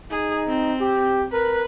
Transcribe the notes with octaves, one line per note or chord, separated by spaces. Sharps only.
D#4 G#4
C4
G4
A#4 B4